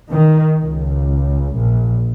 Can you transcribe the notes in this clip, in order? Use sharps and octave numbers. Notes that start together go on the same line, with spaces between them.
D#3
C#2
A#1